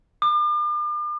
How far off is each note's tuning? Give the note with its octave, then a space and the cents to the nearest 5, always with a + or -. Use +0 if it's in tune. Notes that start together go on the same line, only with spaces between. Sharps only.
D6 +40